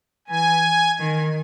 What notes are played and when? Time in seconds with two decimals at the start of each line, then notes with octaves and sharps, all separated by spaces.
0.28 E3 G#5
0.99 D#3